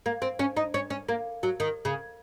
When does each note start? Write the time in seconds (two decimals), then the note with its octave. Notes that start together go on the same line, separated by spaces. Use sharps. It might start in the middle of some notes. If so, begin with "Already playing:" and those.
0.06 A#3
0.22 C4
0.39 C#4
0.57 D#4
0.74 C#4
0.90 C#4
1.09 A#3
1.43 F#3
1.60 D#3
1.85 C#3